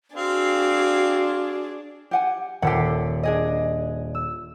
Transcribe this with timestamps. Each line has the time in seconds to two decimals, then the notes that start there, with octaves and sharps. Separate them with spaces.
0.16 C4 D4 F#4 G#4 F5
2.11 G4 F#5 G#5
2.62 D#1 G4 A4 F#5 B6 C7
3.23 D4 G#4 D#5
4.15 E6